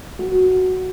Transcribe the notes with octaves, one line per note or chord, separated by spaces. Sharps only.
F#4